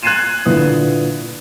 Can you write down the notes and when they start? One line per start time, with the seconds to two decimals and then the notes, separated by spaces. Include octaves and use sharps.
0.03 F#6 G#6 A6 C7 D#7 E7
0.46 A#2 D3 E4 B4 D#6